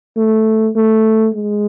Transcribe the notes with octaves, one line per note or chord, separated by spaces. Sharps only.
A3
A3
G#3